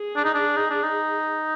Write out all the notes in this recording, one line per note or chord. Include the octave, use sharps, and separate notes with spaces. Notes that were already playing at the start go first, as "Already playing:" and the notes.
Already playing: G#4
D4
D#4
D4
D#4
D4
D#4